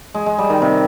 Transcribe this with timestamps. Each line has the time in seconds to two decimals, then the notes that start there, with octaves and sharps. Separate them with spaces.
0.15 G#3
0.26 G#3
0.38 G3
0.50 D#3
0.62 C3